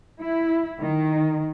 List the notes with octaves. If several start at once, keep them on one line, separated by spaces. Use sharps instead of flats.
E4
D#3